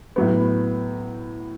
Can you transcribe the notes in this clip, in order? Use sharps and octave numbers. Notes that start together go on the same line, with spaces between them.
A2 F#3 B3